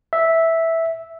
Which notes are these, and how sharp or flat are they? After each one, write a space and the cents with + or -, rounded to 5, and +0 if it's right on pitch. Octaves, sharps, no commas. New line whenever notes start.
E5 -5